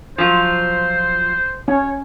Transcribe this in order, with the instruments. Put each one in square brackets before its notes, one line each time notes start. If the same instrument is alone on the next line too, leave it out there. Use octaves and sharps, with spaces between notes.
[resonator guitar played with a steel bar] F3 F#3 F4 [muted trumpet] C5
[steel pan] C#4 [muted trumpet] C#5